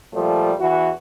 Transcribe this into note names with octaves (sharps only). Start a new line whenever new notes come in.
A#2 F3 G3 A3
E2 E3 F#4